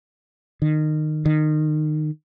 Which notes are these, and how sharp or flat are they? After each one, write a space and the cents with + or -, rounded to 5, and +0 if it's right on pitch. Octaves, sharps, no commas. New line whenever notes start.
D#3 -20
D#3 -25